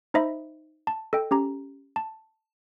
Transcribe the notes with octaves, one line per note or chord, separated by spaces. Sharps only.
D#4 C5 D#5 E5 B5
A5
A4 D#5 G5
C#4 G4 A#5
A5